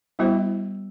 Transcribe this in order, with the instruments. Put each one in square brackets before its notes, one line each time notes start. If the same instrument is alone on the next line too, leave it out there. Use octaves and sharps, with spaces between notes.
[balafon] G3 B3 F#4 C5 [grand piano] E4